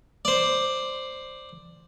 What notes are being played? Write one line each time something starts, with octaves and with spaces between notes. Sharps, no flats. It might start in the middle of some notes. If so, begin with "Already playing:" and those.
C5 D5